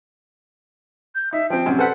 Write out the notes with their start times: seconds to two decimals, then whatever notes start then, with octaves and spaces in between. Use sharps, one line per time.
1.15 G6
1.33 D#4 E5
1.50 F3 C4 G5
1.66 F#2 C3
1.79 A4 B4 C5 F#5